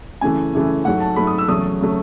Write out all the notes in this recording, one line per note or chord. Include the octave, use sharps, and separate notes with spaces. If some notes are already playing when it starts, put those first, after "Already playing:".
F#2 C#3 E3 A3 G#5
F#2 C#3 E3 A3
G#2 F#3 A3 F#5
A5
G#2 F#3 A3 B5
D#6
E6
E2 C#3 F#3 A3 D#6
C#3 F#3 A3